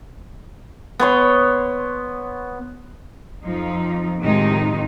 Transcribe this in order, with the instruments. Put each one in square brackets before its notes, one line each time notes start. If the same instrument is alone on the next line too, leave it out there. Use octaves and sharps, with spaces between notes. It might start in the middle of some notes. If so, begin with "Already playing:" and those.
[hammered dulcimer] B3 C#5 C6
[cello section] F2 F3 D#4
A2 C3 D#3 F3 G#3 D#4